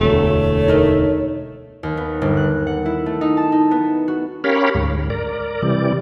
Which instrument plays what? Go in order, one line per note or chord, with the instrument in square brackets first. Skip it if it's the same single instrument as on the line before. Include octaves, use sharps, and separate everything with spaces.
[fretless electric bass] E1 D2 [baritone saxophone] A3 [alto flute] C#5
[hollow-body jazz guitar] D#4 A#4 D#5
[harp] D#2
B3
G1
F#6
F#5
E4
A3
D#4
A5
D#4
B3
F#4
[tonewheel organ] C#4 G4 A#4 C#5 F5 B5
D2 G#2
A#4 D5
C3 E3 G3 D5